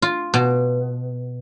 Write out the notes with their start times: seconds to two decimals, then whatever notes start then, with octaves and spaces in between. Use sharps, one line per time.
0.02 F4
0.34 B2